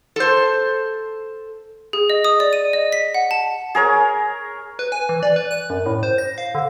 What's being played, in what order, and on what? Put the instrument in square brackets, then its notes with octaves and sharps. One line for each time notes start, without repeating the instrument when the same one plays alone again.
[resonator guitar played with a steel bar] A4 C5
[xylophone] G#4
D#5
D#6
D5
D#7
D#5
B6
F#5
A5
[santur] G#4 A#4 C#5
[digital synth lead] B4
G#5
E3
D5
B4
F#6
F#2
A2
C5
A#6
F5
D3